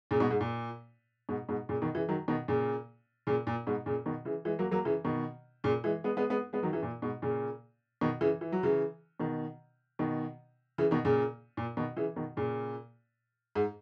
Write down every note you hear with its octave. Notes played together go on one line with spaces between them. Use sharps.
A#2 C#3
G#2 B2
G#2
A#2
G#2 B2
G#2 B2
A#2 C#3
B2 D#3
C#3 E3
D#3 F#3
B2 D#3
A#2 C#3
A#2 C#3
A#2
G#2 B2
A#2 C#3
B2 D#3
C#3 E3
E3 G#3
F#3 A#3
F#3 A#3
C#3 E3
B2 D#3
A#2 C#3
E3 G#3
G#3 B3
G#3 B3
G#3 B3
G#3 B3
D#3 F#3
C#3 E3
A#2
G#2 B2
A#2 C#3
B2 D#3
C#3 E3
E3
F#3
C#3 E3
B2 D#3
B2 D#3
C#3 E3
B2 D#3
A#2 C#3
A#2
B2 D#3
C#3 E3
B2 D#3
A#2 C#3
G#2